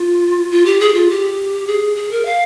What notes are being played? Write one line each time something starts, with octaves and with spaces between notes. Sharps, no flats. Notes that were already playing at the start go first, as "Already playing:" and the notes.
Already playing: F4
F4
G4
G#4
F4
G4
G#4
G#4
A#4
F5